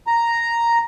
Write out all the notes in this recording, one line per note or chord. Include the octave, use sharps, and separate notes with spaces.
A#5